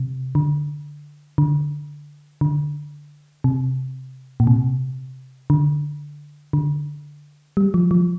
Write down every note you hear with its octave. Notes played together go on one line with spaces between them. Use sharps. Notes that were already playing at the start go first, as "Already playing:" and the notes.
Already playing: C3
D3
D3
D3
C3
A#2
C3
D3
D3
G3
F3
F3